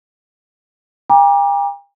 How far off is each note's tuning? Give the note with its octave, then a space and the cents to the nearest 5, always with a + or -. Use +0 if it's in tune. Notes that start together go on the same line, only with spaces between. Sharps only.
G5 +40 A#5 +35 D6 +10